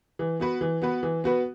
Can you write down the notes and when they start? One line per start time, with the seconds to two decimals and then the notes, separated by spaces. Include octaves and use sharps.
0.19 E3
0.40 B3 F#4 B4
0.61 E3
0.82 B3 F#4 B4
1.03 E3
1.24 B3 F#4 B4